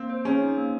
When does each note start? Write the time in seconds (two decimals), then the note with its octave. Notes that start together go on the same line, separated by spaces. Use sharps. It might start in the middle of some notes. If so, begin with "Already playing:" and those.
Already playing: A#3 C4
0.10 C5
0.25 C#4 G#4
0.41 D#4
0.57 A#3